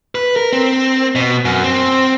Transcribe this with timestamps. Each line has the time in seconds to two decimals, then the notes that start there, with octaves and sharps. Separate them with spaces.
0.15 B4
0.36 A#4
0.53 C4
1.15 B2
1.45 F#2
1.64 C4